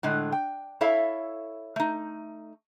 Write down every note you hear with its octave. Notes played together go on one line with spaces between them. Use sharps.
A2 D3 G#3
G5
E4 A4 C#5 E5 F5
A3 D#4